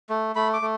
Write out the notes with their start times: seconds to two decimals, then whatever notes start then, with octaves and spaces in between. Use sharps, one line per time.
0.10 A3
0.36 A3 B5
0.53 D6
0.62 A3